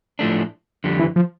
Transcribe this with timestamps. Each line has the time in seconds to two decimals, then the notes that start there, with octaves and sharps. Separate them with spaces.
0.19 A2 F3 A3 D4
0.84 F2 D3 G3
0.99 E3
1.16 F3